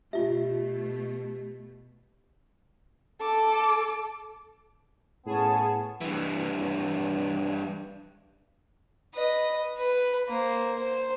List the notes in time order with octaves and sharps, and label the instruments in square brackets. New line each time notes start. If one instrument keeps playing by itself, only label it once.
[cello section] B2 A3 [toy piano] F4 E5 [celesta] G4
[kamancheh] A4 D6
[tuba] A2 [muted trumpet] B3 [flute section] C#4 A5 [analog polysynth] G#4
[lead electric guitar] G2 E3
[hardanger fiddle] B4 D#5
B4
A#3 C5
C5